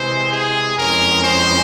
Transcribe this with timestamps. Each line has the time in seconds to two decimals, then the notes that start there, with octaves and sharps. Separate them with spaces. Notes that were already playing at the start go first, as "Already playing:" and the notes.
Already playing: C3 E3 G#3 C5
0.31 G#4
0.77 F2 E3 G#3 C#4 A#4
1.24 C5